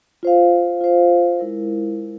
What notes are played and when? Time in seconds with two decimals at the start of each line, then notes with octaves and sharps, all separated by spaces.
0.23 F4 C5 F5
0.81 F4 C5 F5
1.39 G#3 E4 A#4